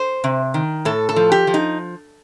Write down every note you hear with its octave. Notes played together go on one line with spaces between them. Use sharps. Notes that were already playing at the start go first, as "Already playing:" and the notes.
Already playing: C5
C3
D#3
A2 A4
A4
F3
G4
F3
D#4